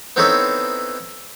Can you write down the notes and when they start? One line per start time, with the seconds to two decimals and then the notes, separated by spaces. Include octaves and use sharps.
0.16 B3 C4 D#4 E4 A4 C#5